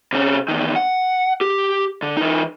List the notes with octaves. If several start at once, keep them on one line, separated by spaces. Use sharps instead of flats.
C3 C#4
E2 D#3
F#5
G4
D3
E3 D#4